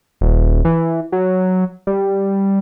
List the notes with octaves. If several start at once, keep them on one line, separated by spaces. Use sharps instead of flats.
D#1
E3
F#3
G3